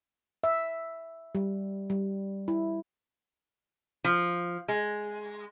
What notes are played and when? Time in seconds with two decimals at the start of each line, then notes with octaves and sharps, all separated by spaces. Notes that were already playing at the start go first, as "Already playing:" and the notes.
0.44 E5
1.35 G3
1.90 G3
2.48 E4
4.04 F3
4.68 G#3